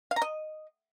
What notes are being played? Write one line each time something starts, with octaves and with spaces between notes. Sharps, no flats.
F5
A#5
D#5